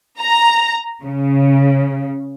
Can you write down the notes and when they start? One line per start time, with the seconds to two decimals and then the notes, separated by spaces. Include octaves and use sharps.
0.20 A#5
1.03 C#3